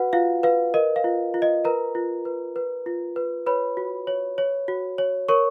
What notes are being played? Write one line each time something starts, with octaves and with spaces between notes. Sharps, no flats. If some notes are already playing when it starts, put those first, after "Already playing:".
Already playing: F#4 B4 F#5
F4 F5
B4 F5
A#4 D#5
F5
F4
F4
D#5
A#4 B4 A#5
F4
B4
B4
F4
B4
B4 C#5 B5
F#4
C#5
C#5
F#4
C#5
A#4 C#5 C#6